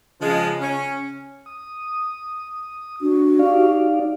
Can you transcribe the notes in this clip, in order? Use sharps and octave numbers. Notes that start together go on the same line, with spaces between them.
C#3 F3 G#3
C#4
D#6
D4 F#4
D#4 G4 D5 F5